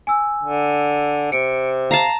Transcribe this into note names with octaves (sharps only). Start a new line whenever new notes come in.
G#5 E6
D3
C3 C#7 D7
F5 A5 A#5 C7